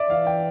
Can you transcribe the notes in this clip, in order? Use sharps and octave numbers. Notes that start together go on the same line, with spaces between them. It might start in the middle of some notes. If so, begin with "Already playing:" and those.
Already playing: D5 E5
E3 F5
G5